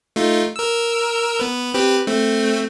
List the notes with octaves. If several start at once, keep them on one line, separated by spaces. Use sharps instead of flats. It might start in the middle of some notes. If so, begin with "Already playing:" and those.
A3 D#4 F4
A#4 E6
B3 B4
C4 G4 B4
A3 C4